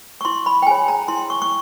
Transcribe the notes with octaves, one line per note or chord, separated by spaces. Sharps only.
C#6
E4 C6
B5
G5
G#4 C#5 G#5
A#5
E4 C6
C#6
C#6